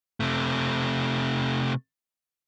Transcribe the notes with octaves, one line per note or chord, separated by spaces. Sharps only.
C3 A3